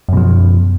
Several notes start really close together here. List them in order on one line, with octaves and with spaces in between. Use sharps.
F#2 B2 F3